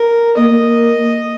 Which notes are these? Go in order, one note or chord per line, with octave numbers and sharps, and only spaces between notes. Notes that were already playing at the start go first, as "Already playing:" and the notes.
Already playing: A#4
A#3 D#5